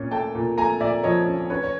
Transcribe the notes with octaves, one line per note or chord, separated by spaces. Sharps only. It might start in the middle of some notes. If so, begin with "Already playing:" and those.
Already playing: A#2 C#4
A3 G5 A5
A#2
A3 G#5 A#5
A#2 D5 E5
F3 C#5 D#5
C#4
C#4 B4 C#5
C#5